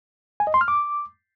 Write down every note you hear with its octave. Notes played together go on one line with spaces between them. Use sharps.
G#5
D#5
C6
F6
D6